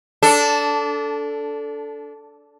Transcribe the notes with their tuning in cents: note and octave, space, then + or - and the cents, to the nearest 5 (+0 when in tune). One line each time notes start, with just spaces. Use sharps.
D4 -20 A4 +0